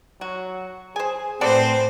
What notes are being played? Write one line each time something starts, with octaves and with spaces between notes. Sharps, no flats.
F#3 F#4
G#4 C5 G#5
A2 C4 F#4 A4 B4 C5 D5